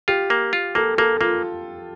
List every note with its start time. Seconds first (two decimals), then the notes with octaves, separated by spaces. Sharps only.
0.08 F4 G4
0.30 A#3
0.53 F4
0.75 A#3 A4
0.98 A#3 A4
1.21 A#3 F4